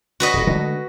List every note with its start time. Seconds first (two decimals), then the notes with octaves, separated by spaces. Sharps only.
0.20 F#4 B4 D#5
0.34 D#1 A2
0.47 D3 G#3 A3